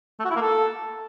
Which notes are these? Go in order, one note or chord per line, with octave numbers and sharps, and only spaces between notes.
A3
F#4
E4
A#3
A4